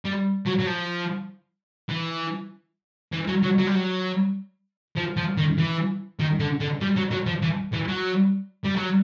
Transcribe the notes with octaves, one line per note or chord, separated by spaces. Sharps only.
G3
F#3
F#3
F3
E3
E3
F#3
F#3
F#3
G3
F#3
F3
F3
D#3
E3
D#3
D3
D3
G3
F#3
F#3
F3
E3
E3
F#3
G3
F#3